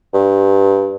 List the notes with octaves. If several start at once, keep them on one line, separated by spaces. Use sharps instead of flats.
G2